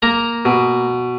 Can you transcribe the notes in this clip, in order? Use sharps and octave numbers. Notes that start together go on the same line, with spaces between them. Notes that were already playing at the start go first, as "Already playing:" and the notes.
A#3 A#5
B2